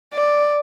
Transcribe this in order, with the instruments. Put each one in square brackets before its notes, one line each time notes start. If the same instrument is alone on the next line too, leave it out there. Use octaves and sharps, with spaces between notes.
[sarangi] D5